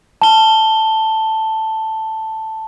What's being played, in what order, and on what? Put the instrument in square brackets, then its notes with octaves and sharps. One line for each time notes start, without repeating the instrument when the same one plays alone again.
[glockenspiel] A5 G7